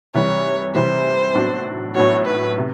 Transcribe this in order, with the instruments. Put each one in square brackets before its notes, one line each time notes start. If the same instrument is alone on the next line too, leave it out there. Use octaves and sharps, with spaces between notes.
[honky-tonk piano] C3 E3 G3 [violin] C#5
[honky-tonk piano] C3 E3 G3 [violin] C5
[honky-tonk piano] A2 F#3 B3 D4 F#4
[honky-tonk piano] A2 F#3 B3 D4 F#4 [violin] C#5
[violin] B4
[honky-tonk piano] C3